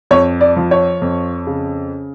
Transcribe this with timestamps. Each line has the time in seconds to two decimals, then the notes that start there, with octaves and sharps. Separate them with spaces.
0.11 F2 C#5
0.41 D5
0.57 F3
0.71 C#5
1.02 F2
1.47 C#3